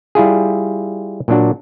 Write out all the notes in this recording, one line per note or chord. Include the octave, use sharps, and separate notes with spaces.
G3 E4 F4 G#4
A#2 F#3 D4 F#4